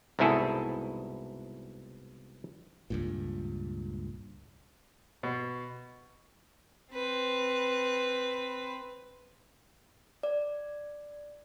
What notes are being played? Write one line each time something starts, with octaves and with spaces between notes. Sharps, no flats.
C2 G#2 B2 E4 G#4 A4
C#2 G2 A#2
B2
C4 B4
D5